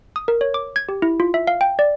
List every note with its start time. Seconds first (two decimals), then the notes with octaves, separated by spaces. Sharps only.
0.16 D#6
0.28 A#4
0.41 C#5
0.54 D6
0.76 G#6
0.89 G4
1.02 E4
1.20 F4
1.34 E5
1.47 F5
1.61 G5
1.79 D5